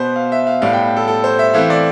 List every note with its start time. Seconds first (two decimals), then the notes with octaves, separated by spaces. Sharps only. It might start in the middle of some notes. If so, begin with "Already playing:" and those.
Already playing: B2 B3 C5
0.16 F5
0.32 E5
0.47 F5
0.61 A2 G3 B3 F5
0.73 G5
0.96 A4
1.08 A4
1.24 C5
1.39 E5
1.54 E3 A3 C4 F5
1.70 D5